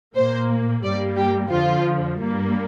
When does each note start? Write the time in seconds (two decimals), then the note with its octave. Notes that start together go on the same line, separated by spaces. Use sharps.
0.16 A#2 A#3 C5
0.83 G2 G3 A#3 D5
1.17 G4
1.51 F2 D3 F3 F4
2.19 G2 G3 A#3